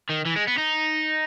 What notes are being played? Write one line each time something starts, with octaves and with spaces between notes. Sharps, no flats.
D#3
E3
G#3
B3
D#4